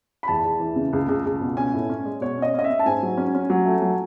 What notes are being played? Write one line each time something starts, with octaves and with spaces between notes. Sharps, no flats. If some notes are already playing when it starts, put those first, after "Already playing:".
B5
E2 A5
E2
E3
C#3
C#2
C#2
C#2
B2
C#4 G#5
A2
C#4
G#3
B2 C#5
C#4 D#5
C#4 D#5
E5
C#4
A5
G#2 G#5
F#3
C#4
C#4
F#3
A3
F#3